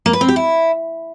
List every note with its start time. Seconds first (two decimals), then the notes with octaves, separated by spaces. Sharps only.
0.06 A#3
0.13 B4
0.21 C4
0.28 G4
0.36 E4